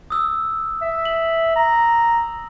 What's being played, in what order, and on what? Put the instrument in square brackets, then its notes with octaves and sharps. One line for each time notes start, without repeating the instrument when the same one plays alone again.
[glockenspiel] D#6 E6
[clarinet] E5
[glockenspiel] F#7
[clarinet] A#5